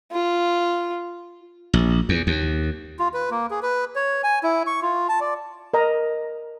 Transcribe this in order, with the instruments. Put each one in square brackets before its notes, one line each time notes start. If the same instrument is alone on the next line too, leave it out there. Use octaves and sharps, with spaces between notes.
[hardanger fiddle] F4
[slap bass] A#1
E2
D#2
[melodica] F4
B4
A#3
G#4
B4
C#5
G#5
E4
C#6
F4
A5
D5
[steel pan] A#4 D#5 A#5